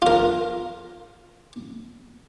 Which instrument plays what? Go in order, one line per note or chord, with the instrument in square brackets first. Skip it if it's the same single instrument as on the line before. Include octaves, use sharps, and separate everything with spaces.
[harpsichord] F4 A#4